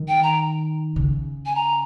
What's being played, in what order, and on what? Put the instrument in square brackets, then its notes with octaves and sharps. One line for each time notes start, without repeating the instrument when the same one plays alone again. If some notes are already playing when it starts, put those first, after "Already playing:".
Already playing: [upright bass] D#3
[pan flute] G5
A#5
[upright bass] C#3
[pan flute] G#5
A#5